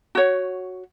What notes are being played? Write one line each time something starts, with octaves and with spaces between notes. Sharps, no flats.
F#4 C#5